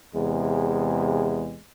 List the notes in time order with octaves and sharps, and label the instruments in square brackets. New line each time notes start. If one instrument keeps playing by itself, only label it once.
[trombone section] E2 C3 G#3